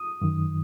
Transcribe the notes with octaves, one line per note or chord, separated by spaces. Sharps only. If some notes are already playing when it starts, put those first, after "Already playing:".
Already playing: D#6
F#2 D#3